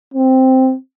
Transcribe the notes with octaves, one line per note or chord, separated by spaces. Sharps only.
C4